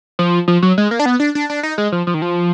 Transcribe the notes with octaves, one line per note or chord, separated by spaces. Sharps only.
F3
F3
F#3
G#3
A#3
D4
B3
D4
D4
D4
D#4
G#3
F3
F3
D#3
F3